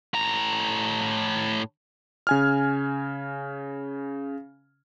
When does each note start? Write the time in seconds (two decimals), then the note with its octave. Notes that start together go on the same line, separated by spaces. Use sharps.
0.14 A2 A#5
2.27 C#3 G#5 F6